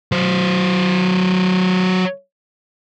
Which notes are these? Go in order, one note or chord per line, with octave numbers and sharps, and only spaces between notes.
F#3 C5